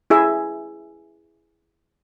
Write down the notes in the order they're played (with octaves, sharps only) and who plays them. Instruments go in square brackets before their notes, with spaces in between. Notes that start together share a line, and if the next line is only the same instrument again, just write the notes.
[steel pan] E4 G#4 E5